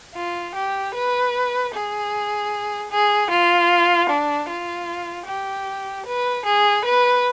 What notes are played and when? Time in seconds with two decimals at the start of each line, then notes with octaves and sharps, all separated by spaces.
0.15 F4
0.55 G4
0.94 B4
1.74 G#4
2.91 G#4
3.31 F4
4.09 D4
4.48 F4
5.27 G4
6.06 B4
6.45 G#4
6.85 B4